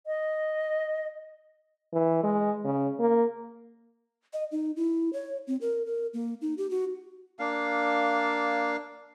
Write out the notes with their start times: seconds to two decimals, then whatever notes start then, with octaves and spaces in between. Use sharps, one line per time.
0.07 D#5
1.93 E3
2.24 G#3
2.65 C#3
2.99 A#3
4.33 D#5
4.51 D#4
4.76 E4
5.13 C#5
5.47 C4
5.61 A#4
5.86 A#4
6.14 A#3
6.41 D#4
6.58 G4
6.71 F#4
7.39 A#3 D4 F5